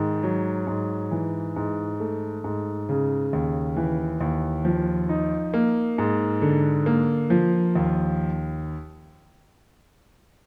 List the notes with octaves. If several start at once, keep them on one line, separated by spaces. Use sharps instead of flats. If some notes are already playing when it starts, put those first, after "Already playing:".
Already playing: G#2 D#3
F#3
G#2
E3
G#2
A3
G#2
C#3
D#2
E3
D#2
F3
D#4
A#3
G#2
D3
A#3
F3
D#2